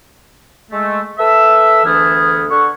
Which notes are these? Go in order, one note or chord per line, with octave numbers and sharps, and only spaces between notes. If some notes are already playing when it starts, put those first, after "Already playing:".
G#3 A3
A4 B4 E5
D2 E3 B3 G#4 F6
D3 A4 F#5 C#6